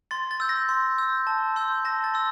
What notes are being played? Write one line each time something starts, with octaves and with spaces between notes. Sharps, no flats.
C6 A6
A6
E6 G6
A#6
C6
E6 G6
A5
C6 E6 G6
A5 A#6
A6
C6 E6